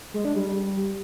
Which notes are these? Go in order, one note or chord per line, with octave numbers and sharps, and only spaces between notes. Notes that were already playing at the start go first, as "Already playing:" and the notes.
G#3
D4
G3